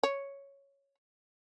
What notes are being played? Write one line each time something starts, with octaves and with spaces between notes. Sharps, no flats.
C#5